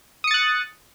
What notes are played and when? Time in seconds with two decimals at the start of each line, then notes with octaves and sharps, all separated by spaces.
0.24 D#6
0.27 C#7
0.31 A6
0.34 F#6